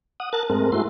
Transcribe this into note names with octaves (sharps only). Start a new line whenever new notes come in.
F#5 D#6
A#4 A5 F#6 A6
G#2 G#3 A3 C4 A#4
G#3 A3 E4 F#4 C6